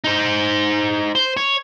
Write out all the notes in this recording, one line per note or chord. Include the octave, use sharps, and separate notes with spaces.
D#4 C5
C5
C#5